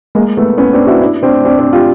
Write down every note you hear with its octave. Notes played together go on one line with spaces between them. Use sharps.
G#3 A#3
A3 B3
B3 C#4
C4 D4
E4 F#4
D4 E4
C4 D4
C4 D4
C4 D4
F4 G4